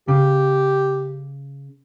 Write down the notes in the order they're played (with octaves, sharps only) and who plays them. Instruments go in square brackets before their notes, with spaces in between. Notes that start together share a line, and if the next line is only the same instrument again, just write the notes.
[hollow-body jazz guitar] C#3 [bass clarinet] G4